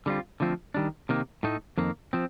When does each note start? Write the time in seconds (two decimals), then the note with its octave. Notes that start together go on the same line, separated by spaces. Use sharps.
0.06 D3 G3 C4 F4
0.40 D3 F3 A3 C4 F4
0.74 D#3 G3 D4
1.09 C3 D#3 A#3
1.43 A2 A3 D#4
1.78 F2 D#3 A#3
2.13 F3 C4